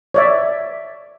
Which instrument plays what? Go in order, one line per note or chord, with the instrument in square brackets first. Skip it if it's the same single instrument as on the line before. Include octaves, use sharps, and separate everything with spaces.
[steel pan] C#5 D5 E5